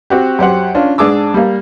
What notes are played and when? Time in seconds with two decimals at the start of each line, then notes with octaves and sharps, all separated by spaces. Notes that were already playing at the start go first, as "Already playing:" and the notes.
0.10 C4 F#4 G4
0.39 F#2 G4 C5 F#5
0.75 C#4 D4 F4
0.98 G#2 D4 G#4 A5 D6 E6
1.34 G3 A#3